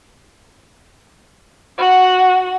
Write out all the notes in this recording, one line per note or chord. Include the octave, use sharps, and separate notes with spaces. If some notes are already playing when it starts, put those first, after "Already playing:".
F#4 F#5